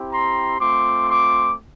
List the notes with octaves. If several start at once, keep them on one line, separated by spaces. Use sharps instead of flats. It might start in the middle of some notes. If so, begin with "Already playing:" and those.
Already playing: C4 E4 G4
A#5 C6
A3 C4 F4 C6 D6
C6 D6